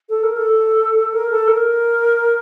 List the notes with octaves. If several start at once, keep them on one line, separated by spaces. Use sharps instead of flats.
A4
A#4
A4
A#4
A4
A#4